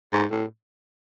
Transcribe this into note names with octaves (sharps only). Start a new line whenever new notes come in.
G#2
A2